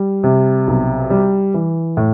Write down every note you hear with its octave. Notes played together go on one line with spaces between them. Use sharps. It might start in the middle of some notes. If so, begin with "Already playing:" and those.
Already playing: G3
C3
B1
G3
E3
A2